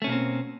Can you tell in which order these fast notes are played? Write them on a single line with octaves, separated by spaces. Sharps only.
A3 C#4 B2 A#3 C4